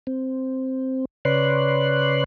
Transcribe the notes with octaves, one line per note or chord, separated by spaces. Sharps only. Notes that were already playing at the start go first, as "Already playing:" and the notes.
C4
C#3 B4 C#5 D5 C6 F#6